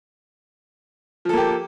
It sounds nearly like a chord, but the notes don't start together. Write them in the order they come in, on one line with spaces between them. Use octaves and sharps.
F3 A4 A#3 G4